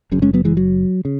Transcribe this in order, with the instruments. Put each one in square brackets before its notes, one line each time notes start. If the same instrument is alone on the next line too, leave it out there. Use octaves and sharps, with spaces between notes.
[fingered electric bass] F#1 F#2 C#3
G#3 C#4
F#3 B3
E3 G#3
F#3
C#3